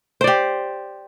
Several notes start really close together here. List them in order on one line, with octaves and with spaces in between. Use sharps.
C5 D5 G4